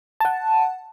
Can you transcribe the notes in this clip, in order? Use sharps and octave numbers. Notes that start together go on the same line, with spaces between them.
F#5 A5